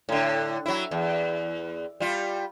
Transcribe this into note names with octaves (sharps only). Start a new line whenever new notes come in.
A2 D3
F#3 E4
E2
G3 F4